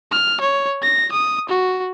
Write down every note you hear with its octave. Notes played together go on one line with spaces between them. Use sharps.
F6
C#5
A#6
D#6
F#4